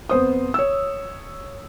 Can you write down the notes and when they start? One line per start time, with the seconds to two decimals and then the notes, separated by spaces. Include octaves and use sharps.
0.10 F2 B3 C5 D#6
0.54 C#5 E6